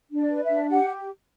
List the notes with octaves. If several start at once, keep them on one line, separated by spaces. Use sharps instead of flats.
D4
D5
B4
E5
D4
G4 F#5